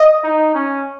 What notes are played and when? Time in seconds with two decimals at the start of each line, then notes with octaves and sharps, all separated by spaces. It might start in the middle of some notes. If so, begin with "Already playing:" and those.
Already playing: D#5
0.24 D#4
0.54 C#4